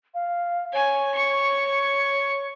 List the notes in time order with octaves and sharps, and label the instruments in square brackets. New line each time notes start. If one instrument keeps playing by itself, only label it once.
[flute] F5
[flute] C#5 [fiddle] G#5
[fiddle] C#6